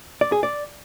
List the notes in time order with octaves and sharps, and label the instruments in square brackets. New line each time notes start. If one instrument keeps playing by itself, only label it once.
[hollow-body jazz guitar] D5
G#4
D5